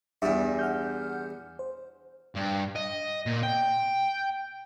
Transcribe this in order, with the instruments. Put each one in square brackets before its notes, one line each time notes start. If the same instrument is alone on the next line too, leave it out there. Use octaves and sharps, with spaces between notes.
[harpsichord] E2 G2 [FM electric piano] E5
[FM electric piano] F#5 F6 G6
C5
[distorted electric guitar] G2
D#5
A#2
G5